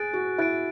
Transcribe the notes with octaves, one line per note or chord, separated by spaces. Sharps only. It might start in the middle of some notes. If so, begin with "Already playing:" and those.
Already playing: G#4 F#6 A6 D7
F#4
E4 F#6 A6 D7